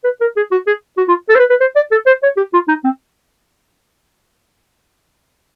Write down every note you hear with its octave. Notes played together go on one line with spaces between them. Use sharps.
B4
A#4
G#4
F#4
G#4
F#4
F4
A4
C5
B4
B4
C5
D5
A4
C5
C#5
G4
F4
D#4
C4